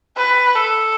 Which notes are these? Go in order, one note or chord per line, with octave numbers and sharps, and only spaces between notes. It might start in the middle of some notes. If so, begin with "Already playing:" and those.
B4
A4